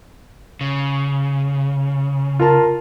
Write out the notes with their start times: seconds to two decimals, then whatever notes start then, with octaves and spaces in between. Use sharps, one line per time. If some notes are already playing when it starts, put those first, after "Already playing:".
0.61 C#3
2.40 F4 A#4 A5